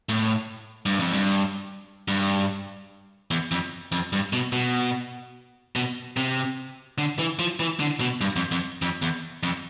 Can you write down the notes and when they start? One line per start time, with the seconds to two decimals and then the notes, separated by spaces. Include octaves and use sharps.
0.09 A2
0.86 G2
0.99 F2
1.13 G2
2.08 G2
3.31 E2
3.51 F2
3.92 F2
4.13 G2
4.33 B2
4.52 B2
5.76 B2
6.17 C3
6.98 D3
7.19 E3
7.39 F3
7.60 E3
7.80 D3
8.00 B2
8.21 G2
8.36 F2
8.52 F2
8.82 F2
9.02 E2
9.43 F2